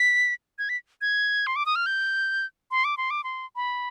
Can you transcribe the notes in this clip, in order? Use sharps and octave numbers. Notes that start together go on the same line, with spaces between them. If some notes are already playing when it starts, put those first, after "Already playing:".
Already playing: B6
G#6
B6
G#6
C6
D6
D#6
F6
G6
C6
D6
C6
D6
C6
B5